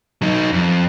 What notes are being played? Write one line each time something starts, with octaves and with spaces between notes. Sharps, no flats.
F#3 D#4
F2